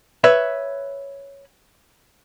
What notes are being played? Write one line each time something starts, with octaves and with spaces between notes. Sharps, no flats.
B4 C#5 E5